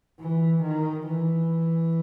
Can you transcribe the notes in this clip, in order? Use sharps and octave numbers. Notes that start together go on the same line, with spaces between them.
E3
D#3
E3